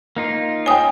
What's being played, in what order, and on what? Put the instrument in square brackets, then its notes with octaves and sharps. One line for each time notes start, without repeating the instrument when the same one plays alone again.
[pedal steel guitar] A#3 D#4 F4
[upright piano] C#4 G5 [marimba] G#5 D#6